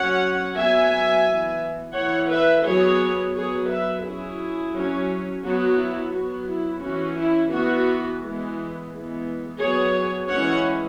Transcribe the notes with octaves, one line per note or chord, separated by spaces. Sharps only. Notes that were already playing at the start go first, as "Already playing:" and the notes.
Already playing: F#3 C#4 C#5 F#5
F#3 B3 E5 G#5
E3 B3
E3 B3 C#5 F#5
B4 E5
F#3 B3 G#4 C#5
F#3 B3 G#4 C#5
B4 E5
F#3 C#4 E4 G#4
F#3 C#4
F#3 B3 F#4
E4
F#3 B3 F#4
E4
E3 C#4 F#4
E4
E3 B3 F#4
E3 G#3 B3
E3 G#3 B3
F#3 B3 G#4 C#5
E3 G#3 C#4 C#5 F#5